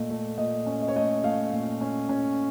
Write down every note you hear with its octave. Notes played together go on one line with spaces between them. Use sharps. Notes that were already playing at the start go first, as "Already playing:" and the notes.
Already playing: A#2 A3 D#5
A3
A#2 D#5
C#4
D#5
C#5
A3 D#5
A3 F5
A#2
C#4
C#4